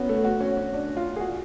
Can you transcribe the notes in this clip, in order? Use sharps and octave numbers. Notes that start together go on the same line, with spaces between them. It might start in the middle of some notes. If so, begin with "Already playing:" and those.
Already playing: B3 C#4 F#4
A3
F#4
C#4
C#4
D4
F4
G#4
F#4